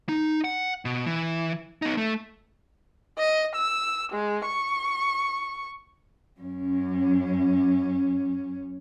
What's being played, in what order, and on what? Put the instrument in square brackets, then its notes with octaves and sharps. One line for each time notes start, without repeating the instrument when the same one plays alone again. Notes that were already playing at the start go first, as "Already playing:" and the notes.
[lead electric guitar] D#4
F#5
B2
E3
B3 D#4
A3
[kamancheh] D#5
E6
G#3
C#6
[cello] F#2 C#4